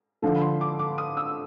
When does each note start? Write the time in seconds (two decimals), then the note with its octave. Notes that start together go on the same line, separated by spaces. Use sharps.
0.22 D3 F3 A3
0.36 B5
0.41 C6
0.61 D6
0.79 D6
0.98 D#6
1.17 E6